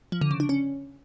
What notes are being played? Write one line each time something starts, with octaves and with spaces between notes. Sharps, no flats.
F3
D3
C#3
D4
C#4